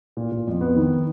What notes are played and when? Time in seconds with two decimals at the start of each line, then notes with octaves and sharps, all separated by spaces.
0.17 A#2
0.32 A#2
0.47 F2
0.61 B3
0.76 D#3